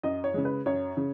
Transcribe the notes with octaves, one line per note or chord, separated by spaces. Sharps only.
F#2 D#5
C#5
C#3 G#3
B4
F#2 C#5
C#3